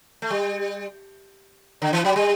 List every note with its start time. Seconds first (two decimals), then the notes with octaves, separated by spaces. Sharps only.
0.22 A3
0.30 G3
1.82 D3
1.93 E3
2.05 F#3
2.16 G3